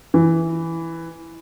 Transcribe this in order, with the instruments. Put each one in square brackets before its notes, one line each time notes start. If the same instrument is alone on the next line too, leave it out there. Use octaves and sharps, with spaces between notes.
[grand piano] E3